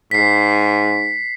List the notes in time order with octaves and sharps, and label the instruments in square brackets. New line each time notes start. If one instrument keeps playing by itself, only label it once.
[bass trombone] G#2 [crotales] B6 C7